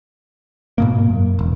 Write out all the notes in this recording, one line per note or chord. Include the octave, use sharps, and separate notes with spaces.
G#2 B2 A#3
F#2
E1